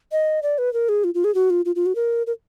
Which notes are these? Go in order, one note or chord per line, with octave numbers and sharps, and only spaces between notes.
D#5
D5
B4
A#4
G#4
F4
F4
G#4
F#4
F4
F4
F4
F#4
A#4
A#4